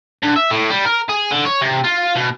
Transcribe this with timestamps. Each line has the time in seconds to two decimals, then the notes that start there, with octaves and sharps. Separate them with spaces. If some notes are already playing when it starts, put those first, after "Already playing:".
0.23 D3
0.36 E5
0.51 A2
0.70 G3
0.85 A#4
1.09 G#4
1.31 D3
1.45 C#5
1.62 C3
1.84 F4
2.16 B2